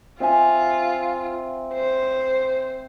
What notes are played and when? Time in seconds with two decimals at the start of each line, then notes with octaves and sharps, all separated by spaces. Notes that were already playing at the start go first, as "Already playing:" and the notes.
0.20 C4 F4 E5 G#5
1.74 C5